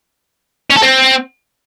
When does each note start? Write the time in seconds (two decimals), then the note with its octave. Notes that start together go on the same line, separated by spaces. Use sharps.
0.70 C#4
0.76 A4
0.82 C4